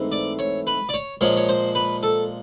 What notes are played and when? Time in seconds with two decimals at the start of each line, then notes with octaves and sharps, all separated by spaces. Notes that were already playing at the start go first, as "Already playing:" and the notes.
Already playing: G#2 E3 A3 C4
0.12 D5
0.39 C#5
0.67 B4
0.89 D5
0.94 C#5
1.21 A#2 F3 G#3 C#5
1.36 C#5
1.49 C5
1.75 B4
2.03 A4